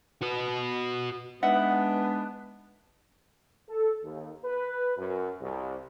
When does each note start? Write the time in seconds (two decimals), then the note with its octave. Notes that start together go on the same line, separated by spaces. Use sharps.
0.22 F#4 B4
1.43 G#3 B3 D4 D#4 B4 E5 F#5
3.69 A4
4.03 D#2
4.45 B4
4.98 F#2
5.41 C2